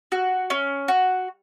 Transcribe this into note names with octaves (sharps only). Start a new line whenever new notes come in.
F#4
C#4
F#4